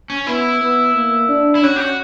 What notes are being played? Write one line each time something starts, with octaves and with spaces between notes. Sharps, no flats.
C#4
B3 E4
B3
A#3
D4
E4
C#4 F#4
G4
F#4